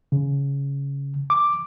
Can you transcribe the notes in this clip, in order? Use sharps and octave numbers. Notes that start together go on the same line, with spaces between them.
C#3
D6